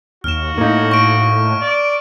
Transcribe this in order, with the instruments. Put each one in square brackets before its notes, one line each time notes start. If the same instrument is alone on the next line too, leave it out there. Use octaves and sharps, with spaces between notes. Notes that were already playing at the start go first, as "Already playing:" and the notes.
[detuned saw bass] D#2 [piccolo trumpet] F#4 [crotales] F6 E7
[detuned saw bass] A2 [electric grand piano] A#3 D#4
[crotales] C#6 D7
[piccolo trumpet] D5